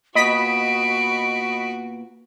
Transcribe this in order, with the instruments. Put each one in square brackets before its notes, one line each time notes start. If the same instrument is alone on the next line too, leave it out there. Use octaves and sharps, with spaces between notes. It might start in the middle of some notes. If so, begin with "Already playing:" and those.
[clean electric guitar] A#2 B3 [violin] F#4 [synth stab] D#5 B5 B6 [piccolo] D7